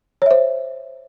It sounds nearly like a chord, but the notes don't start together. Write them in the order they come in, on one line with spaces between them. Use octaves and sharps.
C#5 E5 C5